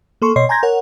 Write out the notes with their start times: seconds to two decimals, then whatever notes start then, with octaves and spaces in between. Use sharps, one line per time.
0.22 A#3 A4 C6 C#6
0.36 B2 C#5 D#5 C6 C7
0.49 G#5 A#5 C6 G6 G#6 A#6
0.63 A#4 C#5 F#5